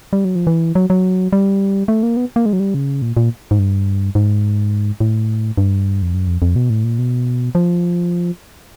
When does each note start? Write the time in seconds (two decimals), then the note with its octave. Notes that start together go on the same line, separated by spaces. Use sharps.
0.13 G3
0.25 F#3
0.35 F3
0.47 E3
0.75 F#3
0.90 F#3
1.33 G3
1.88 A3
2.03 A#3
2.17 B3
2.36 A#3
2.46 G#3
2.53 F#3
2.60 G3
2.74 C#3
3.02 A#2
3.17 A#2
3.51 G#2
3.59 G2
4.15 G#2
5.00 A2
5.58 G2
6.02 F2
6.14 F#2
6.27 F2
6.42 F2
6.56 B2
6.70 A2
6.84 A#2
6.98 B2
7.55 F3